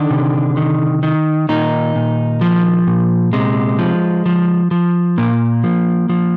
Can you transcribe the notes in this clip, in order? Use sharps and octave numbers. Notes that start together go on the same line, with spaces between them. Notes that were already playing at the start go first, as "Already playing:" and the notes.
Already playing: D3 D#3 D4
C3
D#3
D#3
A#2 D#3 D#4
A#2
F3
A#2
C3 G#3
F3
F3
F3
A#2 A#3
F3
F3